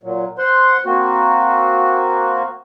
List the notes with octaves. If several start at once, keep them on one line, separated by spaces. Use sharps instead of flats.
A#2 F#3
C5 F#5 C6
A#3 C4 F#4